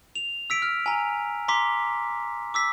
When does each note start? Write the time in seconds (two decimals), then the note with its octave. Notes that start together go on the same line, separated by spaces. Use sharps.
0.15 F7
0.50 E6 B6 D7
0.62 F6
0.86 G#5 A#5
1.48 A#5 C6 D6 B6
2.54 D6 E6 B6